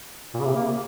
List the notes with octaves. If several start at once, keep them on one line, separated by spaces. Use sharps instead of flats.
A#2
C#3
C3
A#3